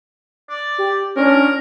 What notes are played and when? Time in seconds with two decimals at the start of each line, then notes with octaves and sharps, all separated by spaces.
0.49 D5
0.78 G4
1.17 C#4 D4 A#4